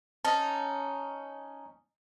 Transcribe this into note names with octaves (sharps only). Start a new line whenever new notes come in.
C#4 D#4 A5